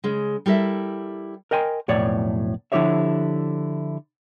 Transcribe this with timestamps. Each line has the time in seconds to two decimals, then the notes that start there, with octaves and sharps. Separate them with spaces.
0.04 C#3 G#3
0.46 G3 E4 A4 A#4 E5
1.51 A#4 D#5 G5 G#5 C6
1.88 B1 F2 A2 C#5 D5
2.72 D3 F3 E4 G4 C#5 E5